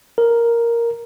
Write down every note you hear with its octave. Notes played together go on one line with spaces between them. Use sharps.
A#4